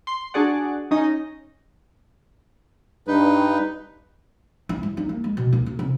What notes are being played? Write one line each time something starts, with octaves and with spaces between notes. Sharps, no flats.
C6
D4 F#4 G#4 D5 F#5
C#4 D#4 D#5
G2 D#4 B4
E4
G3
D#4
A#3
G#3
B2
D#2
D#1
C3